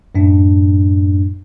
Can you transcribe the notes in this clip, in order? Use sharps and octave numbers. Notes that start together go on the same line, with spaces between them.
F#2 A2 D4